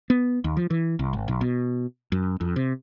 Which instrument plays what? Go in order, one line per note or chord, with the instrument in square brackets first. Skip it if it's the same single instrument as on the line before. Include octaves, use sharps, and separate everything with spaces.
[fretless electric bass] B3
D#2
F3
E3
C2
G#1
B1
B2
F#2
F2
C3